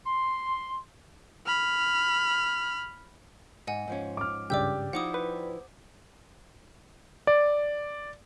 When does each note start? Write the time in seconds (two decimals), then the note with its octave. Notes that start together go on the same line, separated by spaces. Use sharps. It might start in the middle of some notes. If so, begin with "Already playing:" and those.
0.06 C6
1.46 B5 F6
3.67 G#2 D#5 F#5 G#5
3.87 G#2 F3 C#4
4.17 D6 F6
4.50 G2 C#3 G3 G4 D5 D6 E6 G6
4.93 F3 D#4 E4 F#5 D6 D#6
5.14 B4 C5
7.27 D5